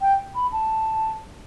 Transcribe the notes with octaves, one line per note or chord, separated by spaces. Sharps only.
G5
B5
A5